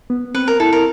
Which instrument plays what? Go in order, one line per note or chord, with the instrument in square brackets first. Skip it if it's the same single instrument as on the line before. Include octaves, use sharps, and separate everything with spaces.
[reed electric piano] B3
[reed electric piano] C4 [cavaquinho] B4
[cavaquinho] A#4
[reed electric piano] E4 [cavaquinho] A4
[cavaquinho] A#4